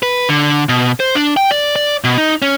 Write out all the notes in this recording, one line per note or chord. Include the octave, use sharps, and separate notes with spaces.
B4
D3
B2
C5
D4
G5
D5
D5
B2
D#4
C#4